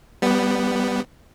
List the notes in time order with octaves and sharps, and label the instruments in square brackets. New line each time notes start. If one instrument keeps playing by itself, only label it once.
[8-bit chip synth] G3 B3